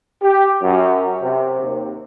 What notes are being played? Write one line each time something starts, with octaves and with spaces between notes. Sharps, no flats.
G4
F#2
C3
D#2